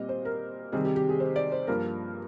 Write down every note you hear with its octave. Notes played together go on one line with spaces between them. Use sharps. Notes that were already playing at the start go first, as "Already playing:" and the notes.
Already playing: A#2 G3 C4 D#5
C5
A#4
C3 D#3 G3 C4 G#4
G4
G4
G#4
C5
D5
C5
G2 F3 A#3 A#4